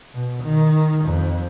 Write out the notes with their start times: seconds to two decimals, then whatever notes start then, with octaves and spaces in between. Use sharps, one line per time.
0.15 B2
0.43 D#3
1.05 F2